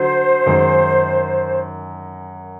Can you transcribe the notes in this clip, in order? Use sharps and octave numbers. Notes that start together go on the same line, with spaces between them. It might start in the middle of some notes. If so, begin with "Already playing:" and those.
Already playing: D3 F#3 C5
F#2 D#3 G#3